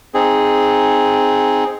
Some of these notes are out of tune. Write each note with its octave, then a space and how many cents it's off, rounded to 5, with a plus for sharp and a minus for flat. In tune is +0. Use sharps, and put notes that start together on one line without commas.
C4 +0 D#4 +0 G#4 +0